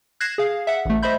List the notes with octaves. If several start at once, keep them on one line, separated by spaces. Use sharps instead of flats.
F#6 G#6 A#6 C7 E7
G#4 F5
E5 F#5
A1 A3
C5 D#5 E5 B5 G6